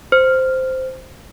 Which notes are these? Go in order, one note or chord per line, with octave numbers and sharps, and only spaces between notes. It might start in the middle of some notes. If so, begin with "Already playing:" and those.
C5